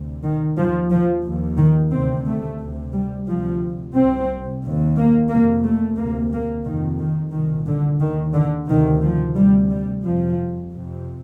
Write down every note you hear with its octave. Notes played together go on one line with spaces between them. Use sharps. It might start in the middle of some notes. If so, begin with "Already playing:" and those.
Already playing: D2 C3
D#3
D#2 F3
F3
D#2
D#3
D2 C3 C4
A3
D2 C3
G3
D2 C3 F3
C2 C3 C4
D#2
A#3
F2 C3 A#3
A3
D2 C3 A#3
A#3
F2 C3 D#3
D#3
C2 A#2 D#3
D3
D#2 D#3
D3
D2 C3 D#3
F3
D2 C3 G3
G3
F2 C3 F3
F2 C3